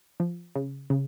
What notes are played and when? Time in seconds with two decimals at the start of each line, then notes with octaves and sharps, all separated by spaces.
0.20 F3
0.55 C#3
0.90 C#3